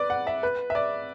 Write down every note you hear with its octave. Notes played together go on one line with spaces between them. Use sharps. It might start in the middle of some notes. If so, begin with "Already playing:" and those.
Already playing: B4 D5
F#5
E5
B4
E5
D5